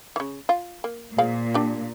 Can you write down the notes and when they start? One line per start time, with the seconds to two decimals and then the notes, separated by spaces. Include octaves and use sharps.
0.16 C#3 E3
0.49 F4
0.84 A#3
1.18 A#2 F3 G#4 F5
1.54 D4 G4